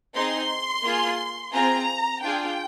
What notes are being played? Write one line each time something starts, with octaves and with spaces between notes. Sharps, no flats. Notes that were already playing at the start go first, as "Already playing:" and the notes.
C4 D#4 G#4 C6
A#3 F4 G#4
C4 F4 G#4 A#5
D4 F4 G#4 G5